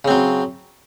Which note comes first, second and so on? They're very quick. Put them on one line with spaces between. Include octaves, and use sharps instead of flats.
C#3 C4 F#3